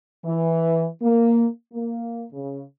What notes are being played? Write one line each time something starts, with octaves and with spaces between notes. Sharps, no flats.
E3
A#3
A#3
C#3